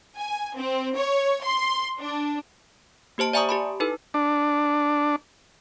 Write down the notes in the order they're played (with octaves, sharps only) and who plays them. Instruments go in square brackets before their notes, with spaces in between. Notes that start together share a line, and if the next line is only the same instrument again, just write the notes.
[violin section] G#5
C4
C#5
C6
D4
[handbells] A#3 G4 C5 A5 D7
D5 E5 G#5 A#5 C#6 D#6
G4 A5 B5
D#4 E4 A4 B4
[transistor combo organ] D4